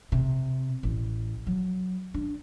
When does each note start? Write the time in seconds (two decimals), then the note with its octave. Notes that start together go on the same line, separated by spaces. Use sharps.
0.12 C3
0.83 A1
1.47 F#3
2.14 D4